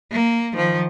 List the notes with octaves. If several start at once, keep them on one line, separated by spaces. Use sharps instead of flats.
A#3
D#3 F3